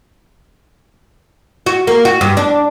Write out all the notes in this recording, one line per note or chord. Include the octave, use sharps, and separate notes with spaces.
F#4
A#3
F#4
G2
D4